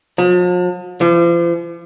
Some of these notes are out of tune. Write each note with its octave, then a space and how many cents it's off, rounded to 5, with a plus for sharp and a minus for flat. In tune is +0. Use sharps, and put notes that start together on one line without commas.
F3 +45
F3 -40